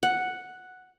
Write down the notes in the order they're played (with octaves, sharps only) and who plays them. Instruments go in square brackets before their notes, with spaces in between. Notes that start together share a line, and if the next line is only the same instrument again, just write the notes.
[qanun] F#5